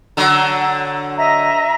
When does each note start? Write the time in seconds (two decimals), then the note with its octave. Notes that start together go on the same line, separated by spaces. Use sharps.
0.17 D3 F#3
1.18 D#5 E5 A#5